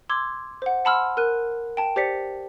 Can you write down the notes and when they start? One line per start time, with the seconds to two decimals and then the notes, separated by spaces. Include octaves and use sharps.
0.09 C6 D6 E6 G#6
0.62 C5 F#5
0.85 F#5 A5 B5 C6 E6 F6
1.17 A#4 F#6 D#7
1.77 G5 A5
1.96 G4 C5 D5 B6 C#7